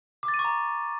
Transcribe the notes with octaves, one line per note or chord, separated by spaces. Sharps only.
D6
A6
D#7
C#6
A#5